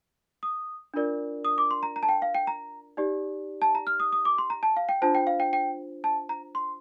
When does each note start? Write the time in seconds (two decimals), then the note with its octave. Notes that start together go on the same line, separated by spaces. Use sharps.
0.43 D#6
0.94 D4 F4 A#4 D5
1.45 D#6
1.58 D6
1.71 C6
1.83 A#5
1.96 A#5
2.03 A5
2.09 G5
2.22 F5
2.35 G5
2.47 A#5
2.97 D#4 G4 D5
3.62 A5
3.75 A#5
3.87 F6
4.00 D#6
4.12 D#6
4.25 D6
4.38 C6
4.50 A#5
4.63 A5
4.77 F5
4.89 G5
5.02 D4 F4 C5 A5
5.15 G5
5.27 F5
5.40 G5
5.53 G5
6.04 A5
6.29 A#5
6.55 C6